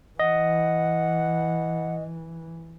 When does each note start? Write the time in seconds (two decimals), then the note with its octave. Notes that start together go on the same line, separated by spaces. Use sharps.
0.19 E3 D#5 F#5